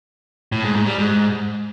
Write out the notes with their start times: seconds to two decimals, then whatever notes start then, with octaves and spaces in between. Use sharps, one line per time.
0.52 A2
0.64 G#2
0.75 G#2
0.87 G3
0.99 G#2